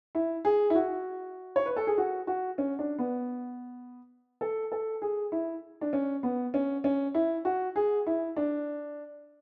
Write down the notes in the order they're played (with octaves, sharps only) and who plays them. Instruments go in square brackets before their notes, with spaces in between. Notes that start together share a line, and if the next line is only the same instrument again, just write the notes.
[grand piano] E4
G#4
E4
F#4
C#5
B4
A4
G#4
F#4
F#4
C#4
D4
B3
A4
A4
G#4
E4
D4
C#4
B3
C#4
C#4
E4
F#4
G#4
E4
D4